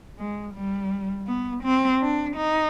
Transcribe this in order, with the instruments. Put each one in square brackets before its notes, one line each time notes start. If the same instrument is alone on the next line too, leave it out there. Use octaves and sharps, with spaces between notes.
[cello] G#3
G3
B3
C4
D4
D#4